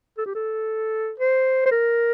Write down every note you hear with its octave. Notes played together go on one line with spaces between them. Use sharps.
A4
G4
A4
C5
C5
A#4